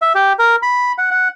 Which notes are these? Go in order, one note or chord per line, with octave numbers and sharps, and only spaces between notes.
E5
G4
A#4
B5
F#5
F#5